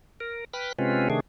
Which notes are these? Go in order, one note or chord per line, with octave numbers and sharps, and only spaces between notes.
A#4
B4 G5 B5 F6 F#6
C3 G#3 C4 C#4 F4 B4
C3 D#3 A3 D4 G#4